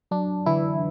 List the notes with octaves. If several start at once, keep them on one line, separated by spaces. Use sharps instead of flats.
F#3 D4
D3 E3 E4